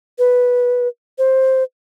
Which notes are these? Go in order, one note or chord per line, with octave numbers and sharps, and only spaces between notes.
B4
C5